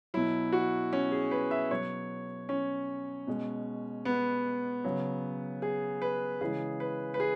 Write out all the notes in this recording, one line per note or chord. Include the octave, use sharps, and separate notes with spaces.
B2 F#3 E4
F#4
C#4
G#4
B4
E5
B2 F#3 C#5
C#4
B2 G#3
B3
C#3 F#3
G#4
B4
C#3 E3 G#3 G#4
B4
B4
G#4